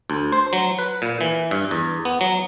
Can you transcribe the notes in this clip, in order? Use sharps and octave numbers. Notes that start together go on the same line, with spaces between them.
D2
C5
F#3
B4
A#2
E3
G2
E2
B3
F#3